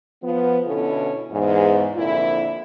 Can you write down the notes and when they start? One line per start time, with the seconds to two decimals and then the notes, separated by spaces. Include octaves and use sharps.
0.23 F3 B3
0.66 B2 D3 C#4 E4 A4
1.30 E2 G#2
1.95 F2 A#2 D3 E4